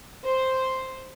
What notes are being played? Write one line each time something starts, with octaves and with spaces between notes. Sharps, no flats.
C5